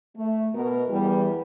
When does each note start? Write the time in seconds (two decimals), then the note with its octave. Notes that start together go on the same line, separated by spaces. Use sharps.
0.17 A3
0.54 B2 A#4
0.89 E2 E3 G3